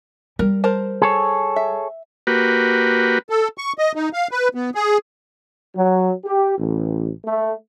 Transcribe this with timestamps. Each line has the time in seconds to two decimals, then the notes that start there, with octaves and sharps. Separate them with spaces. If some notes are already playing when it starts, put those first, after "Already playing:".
0.39 G3 A#4
0.64 A#4 C5 A5
1.02 G#4 A4 C#5
1.56 E5
2.27 A#3 F#4 G4 B4
3.30 A4
3.58 C#6
3.78 D#5
3.95 D#4
4.13 F5
4.31 B4
4.55 B3
4.75 G#4
5.75 F#3
6.24 G4
6.57 A1
7.25 A3